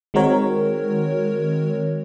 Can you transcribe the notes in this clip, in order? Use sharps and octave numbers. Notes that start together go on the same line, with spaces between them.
D#3 G#3 C4 F#4 A#4 C#5